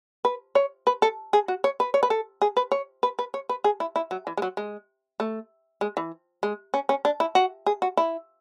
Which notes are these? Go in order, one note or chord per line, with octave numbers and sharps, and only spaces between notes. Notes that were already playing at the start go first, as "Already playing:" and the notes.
B4
C#5
B4
A4
G#4
F#4
C#5
B4
C#5
B4
A4
G#4
B4
C#5
B4
B4
C#5
B4
G#4
E4
E4
F#3
E3
G#3
F#3
G#3
A3
G#3
E3
G#3
C#4
C#4
D4
E4
F#4
G#4
F#4
E4